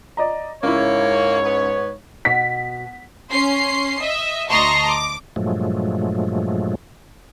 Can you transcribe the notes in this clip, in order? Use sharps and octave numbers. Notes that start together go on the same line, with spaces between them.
D5 D#5 A#5
C#2 G#2 A#3 E4 C#5
B3
B2 B6
C#4 C6 C7
D#5 E5
D2 D#5 A5 A#5 C6 C#6
D6
G2 A#2 F3 F#3 G#3 A3